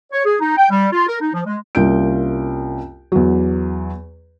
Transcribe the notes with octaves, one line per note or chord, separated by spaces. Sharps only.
C#5
G#4
D#4
G5
G3
F4
A#4
D#4
F3
G#3
C2 A#3 C#4 F4 G6 D7
E2 F#3